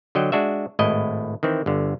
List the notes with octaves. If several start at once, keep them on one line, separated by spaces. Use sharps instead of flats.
D3 F#3 D#5 G5
G#3 D4 F#4 E5
G#1 A2 E4 D#5
D#3 E3 C4
G1 D3